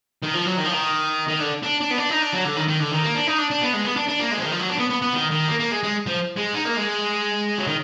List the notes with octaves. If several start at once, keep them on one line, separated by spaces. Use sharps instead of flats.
D#3
F3
F#3
D#3
F3
D#3
D#3
D3
D4
D4
B3
D4
D#4
D4
F#3
D3
D#3
D#3
D3
D#3
A#3
D4
D#4
D4
D4
B3
G#3
B3
D4
D4
A#3
G#3
F3
D#3
F3
F#3
D4
B3
B3
B3
D#3
D#3
A#3
A#3
G#3
G#3
F3
G#3
D#4
A#3
G#3
F#3
D#3